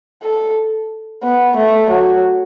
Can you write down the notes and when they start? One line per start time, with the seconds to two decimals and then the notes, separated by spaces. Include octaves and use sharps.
0.23 A4
1.24 B3
1.57 A3
1.91 F#3